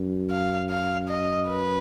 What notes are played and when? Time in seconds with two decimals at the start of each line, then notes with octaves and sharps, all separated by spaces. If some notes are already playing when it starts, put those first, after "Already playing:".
Already playing: F#2
0.31 F5
0.70 F5
1.09 D#5
1.47 B4